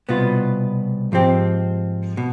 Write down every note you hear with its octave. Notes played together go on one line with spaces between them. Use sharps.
C2 B2 B3 F4
G#2 F3 C4 G4
B2